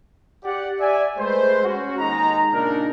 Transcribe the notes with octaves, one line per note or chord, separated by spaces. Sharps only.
G4 D5 F#5
D5 E5 G#5
G#3 A3 B4 C5
C#4 F#4
D#2 G#3 D#4 A#5
A#2 C#3 D4 D#4 A#4